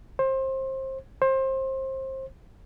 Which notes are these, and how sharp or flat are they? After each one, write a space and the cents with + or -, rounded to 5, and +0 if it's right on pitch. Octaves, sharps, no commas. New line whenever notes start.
C5 +25
C5 +25